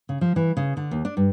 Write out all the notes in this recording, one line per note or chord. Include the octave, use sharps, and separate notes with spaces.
C#3
F3
E3
C#3
D3
D#2
D4
G2